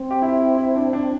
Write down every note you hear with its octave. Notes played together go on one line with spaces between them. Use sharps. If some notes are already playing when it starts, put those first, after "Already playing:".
Already playing: C4
G4
E4
E4
D4
D4